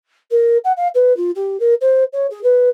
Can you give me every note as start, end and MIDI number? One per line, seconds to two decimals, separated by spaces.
0.31 0.57 70
0.64 0.72 78
0.76 0.87 77
0.94 1.15 71
1.16 1.30 65
1.35 1.59 67
1.59 1.74 70
1.81 2.03 72
2.12 2.26 73
2.30 2.41 68
2.43 2.68 71